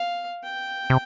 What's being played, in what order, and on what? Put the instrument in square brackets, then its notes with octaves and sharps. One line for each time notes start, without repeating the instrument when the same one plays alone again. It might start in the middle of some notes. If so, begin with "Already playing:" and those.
Already playing: [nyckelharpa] F5
G5
[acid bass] C3